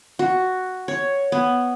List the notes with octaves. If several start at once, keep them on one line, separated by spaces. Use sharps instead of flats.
F#4
C#5
B3